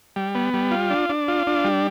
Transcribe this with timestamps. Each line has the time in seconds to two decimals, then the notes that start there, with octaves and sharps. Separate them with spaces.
0.16 G3
0.35 B3
0.54 G3
0.71 F4
0.90 D4
1.09 D4
1.28 F4
1.47 D4
1.65 G3